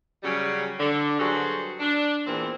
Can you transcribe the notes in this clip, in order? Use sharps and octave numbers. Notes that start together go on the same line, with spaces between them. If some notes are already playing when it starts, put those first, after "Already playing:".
C#3 F#3 G3
D3
G2 F#3 F#4 G#4 A4 C5
D4
E2 A#2 C4